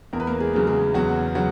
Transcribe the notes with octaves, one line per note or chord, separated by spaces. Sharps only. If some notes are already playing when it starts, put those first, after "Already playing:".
E2 A#4
B4
A#3 A#4
G#3 G#4
C#3 F#3 A#3
G#3 G#4
E2 F#3 F#4
C#3 F#3 F#4